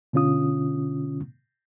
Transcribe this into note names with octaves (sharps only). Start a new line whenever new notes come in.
B2 D3 C#4 F4 D#6